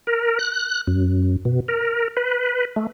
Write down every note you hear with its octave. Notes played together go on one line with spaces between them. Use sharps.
A#4
F#6
F#2
B2
A#4
B4
A3